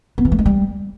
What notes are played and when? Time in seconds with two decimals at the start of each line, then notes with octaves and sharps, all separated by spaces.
0.18 B3
0.25 E3
0.32 A3
0.39 G#3
0.46 G3